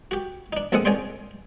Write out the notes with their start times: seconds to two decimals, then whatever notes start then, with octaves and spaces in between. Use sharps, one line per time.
0.11 F#4 G4
0.53 D4 D#4
0.72 A#1 C3 G#3 A4 F#5 D#6
0.85 C2 C#4 G#4 D5 G5 C6